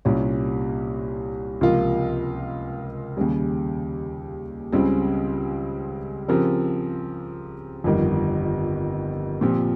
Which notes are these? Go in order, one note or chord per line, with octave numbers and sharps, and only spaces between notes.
C2 A#2 G3 C#4
C#2 C3 F3 A#3 F4
D#2 C#3 G3
C#2 C#3 G3 C4
C#3 F3 C4 G4 A#4
G1 F2 D#3 G3
A#2 F3 C4 G4